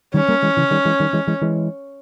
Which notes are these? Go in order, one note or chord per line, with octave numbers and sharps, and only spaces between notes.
D#3 G3 C#4
G3 A#3
E3 G#3
C#3 E3
D#3 G3
E3 G#3
D#3 G3
E3 G#3
E3 G#3
E3 G#3